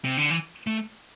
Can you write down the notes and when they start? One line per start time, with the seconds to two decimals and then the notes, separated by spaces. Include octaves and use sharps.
0.05 C3
0.17 D3
0.30 E3
0.67 A3